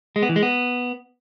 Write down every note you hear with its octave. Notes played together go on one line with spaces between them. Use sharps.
G#3
B3
E3
G#3
B3